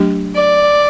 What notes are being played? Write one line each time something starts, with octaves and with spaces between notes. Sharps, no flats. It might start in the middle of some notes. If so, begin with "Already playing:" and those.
Already playing: F#3 A3 D4 G4
D5